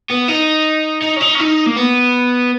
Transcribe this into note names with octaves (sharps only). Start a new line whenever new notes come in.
B3
D#4
D#4
C#4
D#4
C#4
D#4
A#3
B3